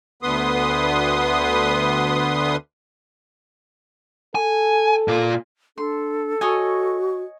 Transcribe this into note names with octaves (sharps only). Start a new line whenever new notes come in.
D2 D3 B3 B4 C6 D#6
A4 G#5
A#2 F4
D4 A4 C6
F#4 C#5 D#5 G#5